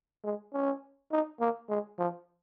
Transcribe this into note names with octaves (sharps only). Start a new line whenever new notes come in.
G#3
C#4
D#4
A#3
G#3
F3